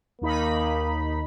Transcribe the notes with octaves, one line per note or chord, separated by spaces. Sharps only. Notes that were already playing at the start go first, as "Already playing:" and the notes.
D#2 A#3 D#4 B5